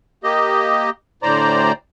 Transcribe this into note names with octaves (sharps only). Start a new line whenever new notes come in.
A#3 G4 D#5
D2 A2 C5 D5 A#5